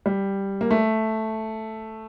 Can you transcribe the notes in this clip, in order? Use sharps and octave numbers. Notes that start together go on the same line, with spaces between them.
G3
A#3
A3